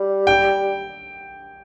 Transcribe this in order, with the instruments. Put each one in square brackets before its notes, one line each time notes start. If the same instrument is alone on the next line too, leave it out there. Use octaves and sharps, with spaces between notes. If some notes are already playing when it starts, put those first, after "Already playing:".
Already playing: [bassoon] G3
[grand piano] G5